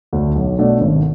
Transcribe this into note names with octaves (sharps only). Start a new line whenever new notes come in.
D2 D3 A3
B1
B2 A3 D4
G#1